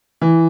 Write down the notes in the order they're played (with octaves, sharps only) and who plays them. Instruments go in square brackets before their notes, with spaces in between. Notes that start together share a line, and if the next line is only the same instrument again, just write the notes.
[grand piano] E3